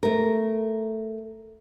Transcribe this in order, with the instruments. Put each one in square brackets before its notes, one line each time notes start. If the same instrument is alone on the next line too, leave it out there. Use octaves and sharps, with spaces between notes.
[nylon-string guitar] A3 A#4